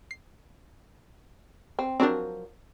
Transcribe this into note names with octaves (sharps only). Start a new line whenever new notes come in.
C7
C4
F3 F#3 C4 D4 A#4